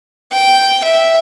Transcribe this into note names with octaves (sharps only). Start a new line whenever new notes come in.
G5
E5